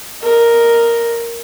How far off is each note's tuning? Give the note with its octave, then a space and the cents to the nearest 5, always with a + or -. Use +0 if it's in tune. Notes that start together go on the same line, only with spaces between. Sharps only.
A#4 +0 D#5 +0